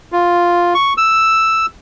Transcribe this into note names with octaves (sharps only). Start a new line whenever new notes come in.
F4
C#6
E6